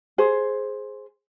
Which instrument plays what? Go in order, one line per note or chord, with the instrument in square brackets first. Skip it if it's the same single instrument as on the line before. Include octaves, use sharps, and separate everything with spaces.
[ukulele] G#4 C5